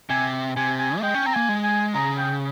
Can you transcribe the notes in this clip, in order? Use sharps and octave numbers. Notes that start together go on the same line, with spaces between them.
C3 G#5
C3 G#5
G#5
A#3
G#3 G5
C#4
C4 A#5
A#3 G#5
G#3
G#5
C#3 A#5
G5